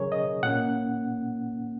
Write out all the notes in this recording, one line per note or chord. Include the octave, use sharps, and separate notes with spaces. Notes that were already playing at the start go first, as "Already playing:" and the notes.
Already playing: C#3 F#3 C#4 G#4 A#4 C#5
D#5
A#2 A#3 C#4 F#5